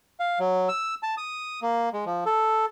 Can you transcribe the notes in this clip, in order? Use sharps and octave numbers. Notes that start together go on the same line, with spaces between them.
F5
F#3
E6
A5
D#6
A#3
G#3
F3
A4